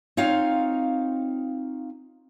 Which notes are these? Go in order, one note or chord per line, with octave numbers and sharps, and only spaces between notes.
C4 D#4 F4 C#5 F5